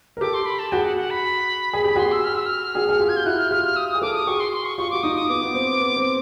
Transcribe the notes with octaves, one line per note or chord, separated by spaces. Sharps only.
A#4
G4 A4 D6
C6
B5
A5
F#4 G#4 G5
F#5
F#5
B5
G#4 B5
G4 B5
F#4 G#4 C6
E6
F6
E6
F6
F#4 G#4
G#4
F4 G4
G#6
G6
E4 F#4 F#6
F6
F4 G4 F6
F6
D#6
D#6
G#4
G4 A4 D6
D#6
F#4 G#4 C#6
C6
C6
C#6
F4 G4 C#6
F#4 D6
D#4 F4 D#6
D#6
B3 D6
B3
C4
B3
C4